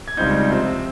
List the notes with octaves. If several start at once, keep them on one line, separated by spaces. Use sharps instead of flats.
G#6
C#2 C#3 G3 C4 D#4 G6
C3 F3 C4